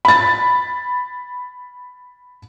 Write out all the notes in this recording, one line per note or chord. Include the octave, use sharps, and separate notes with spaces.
B5 A6